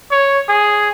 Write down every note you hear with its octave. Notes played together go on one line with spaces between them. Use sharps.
C#5
G#4